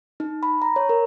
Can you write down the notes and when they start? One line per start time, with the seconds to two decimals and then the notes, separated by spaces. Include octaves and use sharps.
0.20 D#4
0.43 B5
0.62 A#5
0.76 C#5
0.89 A#4